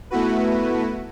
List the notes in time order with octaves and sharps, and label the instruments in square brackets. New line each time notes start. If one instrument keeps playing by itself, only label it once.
[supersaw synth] A3 B3 E4 F#4 B4